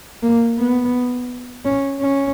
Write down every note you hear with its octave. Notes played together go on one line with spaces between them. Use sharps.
A#3
B3
C#4
C#4